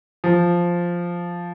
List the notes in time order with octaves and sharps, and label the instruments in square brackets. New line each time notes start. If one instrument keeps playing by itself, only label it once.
[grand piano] F3